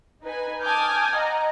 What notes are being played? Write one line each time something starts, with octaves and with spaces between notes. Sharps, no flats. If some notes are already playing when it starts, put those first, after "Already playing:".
D#4 B4 G#5
G#5 A5 D6 D#6 F6 G6
D#5 F#5 A#5